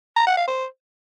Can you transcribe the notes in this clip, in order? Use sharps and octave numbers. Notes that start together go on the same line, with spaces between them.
A#5
F#5
F5
C5